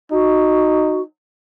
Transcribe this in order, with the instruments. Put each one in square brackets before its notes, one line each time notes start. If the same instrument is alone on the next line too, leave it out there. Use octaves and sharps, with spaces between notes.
[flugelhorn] D#4 [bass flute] F#4